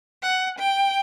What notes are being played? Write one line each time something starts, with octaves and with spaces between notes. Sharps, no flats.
F#5
G5